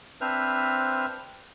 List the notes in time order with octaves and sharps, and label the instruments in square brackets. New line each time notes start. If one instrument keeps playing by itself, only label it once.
[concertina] C4 D4 B4 C5 E5 F6